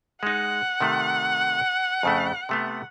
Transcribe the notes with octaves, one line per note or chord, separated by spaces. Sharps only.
G#3 D#4 F#5
C3 D#3 A3
F2 C#3 A3
C3 A3 B3